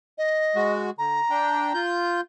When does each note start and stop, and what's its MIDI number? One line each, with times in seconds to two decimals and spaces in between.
0.18 0.73 75
0.55 0.90 56
0.55 0.90 66
0.98 1.21 50
0.98 1.80 82
1.30 1.73 62
1.30 1.73 79
1.74 2.21 65
1.74 2.21 91